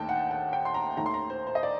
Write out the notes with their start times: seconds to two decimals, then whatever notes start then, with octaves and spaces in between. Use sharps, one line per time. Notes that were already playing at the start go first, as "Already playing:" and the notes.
Already playing: D#2 D#3 A3 D#4 G5 A5
0.09 F#5
0.31 F#5
0.53 G5
0.65 C6
0.74 A#5
0.97 D#2 D#3 A3 A#5
1.06 C6
1.14 A#5
1.30 C5
1.47 C5
1.55 D#5
1.63 D5